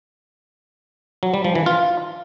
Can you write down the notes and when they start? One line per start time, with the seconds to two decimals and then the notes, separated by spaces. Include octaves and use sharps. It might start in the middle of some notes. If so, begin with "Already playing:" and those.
1.23 F#3
1.34 G3
1.45 F3
1.55 E3
1.66 F4